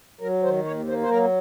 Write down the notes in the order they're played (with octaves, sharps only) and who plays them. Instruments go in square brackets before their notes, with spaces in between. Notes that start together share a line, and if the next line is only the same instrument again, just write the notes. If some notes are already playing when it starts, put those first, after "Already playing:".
[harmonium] F#3 A#4
D#3 C5
D#2 C#5
A#3 C5
C5
F#3 A#4